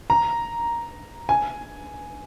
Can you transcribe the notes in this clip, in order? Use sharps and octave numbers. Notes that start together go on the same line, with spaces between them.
A#5
G#5